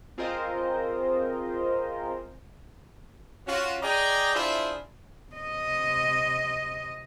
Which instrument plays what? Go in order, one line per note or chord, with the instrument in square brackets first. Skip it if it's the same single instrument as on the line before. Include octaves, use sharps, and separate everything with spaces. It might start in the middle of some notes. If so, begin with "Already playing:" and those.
[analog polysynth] C4 F4 G#4 A#4 C5 D#5
[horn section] C#4 F4 F#4
G#4 D5 D#5 G5 G#5 A#5
D4 E4 F4 G#4 C5 E5
[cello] C3 D#5